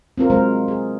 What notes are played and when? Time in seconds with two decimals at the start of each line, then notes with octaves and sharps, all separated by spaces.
0.18 C4 F4 A#4
0.30 C3 F#3 G#3 A#4 C5
0.68 G#4